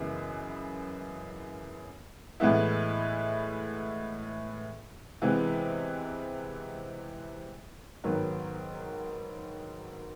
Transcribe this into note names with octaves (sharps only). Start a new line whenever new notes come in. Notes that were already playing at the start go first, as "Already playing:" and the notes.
Already playing: F#2 C#3 E3 G#3 B3
A2 E3 G#3 B3 E4
C3 E3 G#3 B3
G#2 D#3 F#3 B3